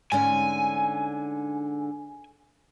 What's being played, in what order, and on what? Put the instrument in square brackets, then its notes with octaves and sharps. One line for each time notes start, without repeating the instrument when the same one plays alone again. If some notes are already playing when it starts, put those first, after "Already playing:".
[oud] G#2 D3 C#4 [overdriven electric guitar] G#5